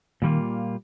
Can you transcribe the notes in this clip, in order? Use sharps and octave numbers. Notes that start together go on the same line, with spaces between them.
A#2 D#3 G3 A#3 F4